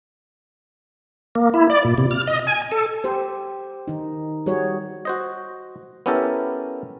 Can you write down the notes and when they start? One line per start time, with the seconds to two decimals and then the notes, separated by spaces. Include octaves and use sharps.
1.35 A#3
1.54 E4
1.70 D5
1.85 A#2
1.98 C3
2.11 F6
2.27 D#5
2.47 G#5
2.72 A4
3.04 G4 C5
3.88 D#3 D#4
4.46 G3 F#4 G#4 C#5
5.05 F#4 C5 D#5
6.06 B3 C#4 E4 G4 A4 A#4